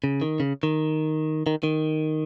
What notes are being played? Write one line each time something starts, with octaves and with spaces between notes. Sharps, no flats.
C#3
D#3
C#3
D#3
D#3
D#3